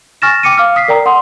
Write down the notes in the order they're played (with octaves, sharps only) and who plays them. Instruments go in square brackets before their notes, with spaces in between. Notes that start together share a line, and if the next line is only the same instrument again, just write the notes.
[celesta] G#5 C#6 F6 A6 A#6 E7
G5 D6 C#7 D#7
F5 D6 F6
D#6 B6 C7
A#4 D5 G5 A#5
F#5 C6 D#6